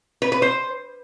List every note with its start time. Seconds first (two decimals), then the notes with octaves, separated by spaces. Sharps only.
0.22 B4
0.32 B4
0.42 C5